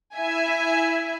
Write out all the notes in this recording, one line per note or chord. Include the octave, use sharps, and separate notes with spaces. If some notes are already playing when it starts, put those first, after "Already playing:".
E4 E5 G#5